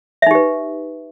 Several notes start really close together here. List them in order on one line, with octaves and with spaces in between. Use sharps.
E5 D#4 G4 B4